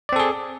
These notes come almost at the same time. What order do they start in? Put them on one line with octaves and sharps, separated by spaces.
D5 C4 A4 G#4